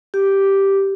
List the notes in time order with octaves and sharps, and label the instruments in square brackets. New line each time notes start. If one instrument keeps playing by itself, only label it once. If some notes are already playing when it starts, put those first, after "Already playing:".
[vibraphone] G4